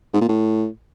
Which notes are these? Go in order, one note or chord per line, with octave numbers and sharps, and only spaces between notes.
G#2
A#2
A2